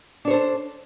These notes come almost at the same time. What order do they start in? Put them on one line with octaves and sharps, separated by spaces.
D4 C#5 C5 A4